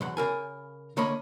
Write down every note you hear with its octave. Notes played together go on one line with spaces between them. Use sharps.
B1 E2 F#5
C#3 A#4 G#5
D3 A#3 C#5 D#5 B5